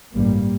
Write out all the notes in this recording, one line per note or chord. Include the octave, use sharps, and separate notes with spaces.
A1 G2 G3 A#3